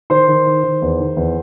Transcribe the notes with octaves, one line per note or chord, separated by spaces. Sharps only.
D#3 C5 C6
D#3
D#3
D#3
E2
D#3
E2